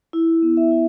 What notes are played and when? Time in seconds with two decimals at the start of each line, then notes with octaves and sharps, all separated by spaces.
0.13 E4
0.42 B3
0.57 E5
0.71 E4